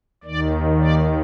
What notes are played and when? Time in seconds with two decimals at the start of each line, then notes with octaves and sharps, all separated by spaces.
0.24 D#2 D#3 D5
0.78 D5